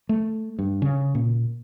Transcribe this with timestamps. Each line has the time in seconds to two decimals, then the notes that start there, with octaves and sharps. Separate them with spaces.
0.09 A3
0.59 G2
0.82 C#3
1.15 A#2